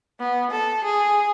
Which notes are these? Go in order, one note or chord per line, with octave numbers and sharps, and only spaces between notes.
B3
A4
G#4